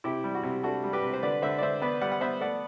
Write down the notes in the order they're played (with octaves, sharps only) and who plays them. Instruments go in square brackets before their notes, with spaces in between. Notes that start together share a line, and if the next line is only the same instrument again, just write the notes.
[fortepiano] C3 E4 G4
G3
F#4
C3
D4 F#4 A4
G3
G4 B4
C3
C5
D3 B4 D5
D3 C5 E5
D5
D3 C5 E5
B3 B4 D5
G3 D5 F#5
F#5
B3 C5 E5
A3 D5 F#5